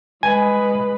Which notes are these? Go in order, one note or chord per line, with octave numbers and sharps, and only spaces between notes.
G#3 B4 G#5